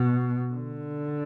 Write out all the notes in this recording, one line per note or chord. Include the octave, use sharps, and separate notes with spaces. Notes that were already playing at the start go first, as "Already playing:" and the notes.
Already playing: B2
D3